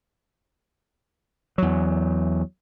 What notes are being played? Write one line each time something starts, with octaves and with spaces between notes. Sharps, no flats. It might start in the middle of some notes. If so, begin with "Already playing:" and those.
E2 F#3